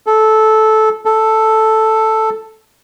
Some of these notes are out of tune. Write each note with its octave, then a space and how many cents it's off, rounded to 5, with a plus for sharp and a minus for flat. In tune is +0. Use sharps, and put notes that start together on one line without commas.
A4 -15
A4 +0